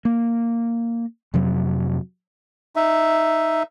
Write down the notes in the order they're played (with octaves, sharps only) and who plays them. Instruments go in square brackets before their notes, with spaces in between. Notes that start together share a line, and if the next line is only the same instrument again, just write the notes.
[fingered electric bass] A#3
F2 C3 F#3
[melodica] D#4 E5